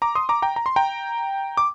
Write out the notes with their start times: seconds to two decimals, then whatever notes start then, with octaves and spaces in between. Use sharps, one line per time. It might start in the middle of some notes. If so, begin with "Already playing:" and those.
0.02 A#5 D6
0.15 C6 D#6
0.29 A#5 D6
0.42 G5 A#5
0.56 A#5
0.66 C6
0.76 G5 A#5
1.57 D6